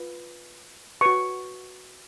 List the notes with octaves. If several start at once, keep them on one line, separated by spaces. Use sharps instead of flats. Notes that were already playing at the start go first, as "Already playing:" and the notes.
Already playing: F4 B4
F#4 B4 C#6